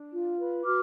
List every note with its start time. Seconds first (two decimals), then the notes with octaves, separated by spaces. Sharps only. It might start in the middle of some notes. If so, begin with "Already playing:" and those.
Already playing: D4
0.12 F4
0.39 B4
0.65 F#4 D6 F6